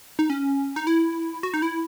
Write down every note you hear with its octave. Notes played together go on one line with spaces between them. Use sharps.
D#4
C#4
D#4
E4
F#4
D#4
E4